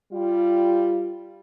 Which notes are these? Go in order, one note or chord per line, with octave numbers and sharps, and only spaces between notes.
G3 F4